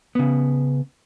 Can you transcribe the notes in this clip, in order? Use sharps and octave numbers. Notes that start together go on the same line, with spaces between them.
C#3 B3